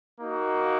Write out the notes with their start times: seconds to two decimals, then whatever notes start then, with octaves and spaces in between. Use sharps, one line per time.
0.20 A#3 D#4 F#4